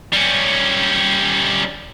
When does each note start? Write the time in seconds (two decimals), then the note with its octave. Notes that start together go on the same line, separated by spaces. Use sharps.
0.12 G3 C#4